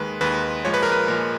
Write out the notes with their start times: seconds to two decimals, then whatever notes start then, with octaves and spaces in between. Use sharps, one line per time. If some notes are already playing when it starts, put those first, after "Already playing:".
Already playing: D#2 D#3 G#3 B4
0.21 D#2 D#3 G#3 B4
0.65 A#2 F3 G#3 C#5
0.74 B4
0.83 A#4
0.92 B4
1.08 A#2 F3 G#3 A#4